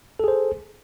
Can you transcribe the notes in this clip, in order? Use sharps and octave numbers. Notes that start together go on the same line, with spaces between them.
G#4 A4 C5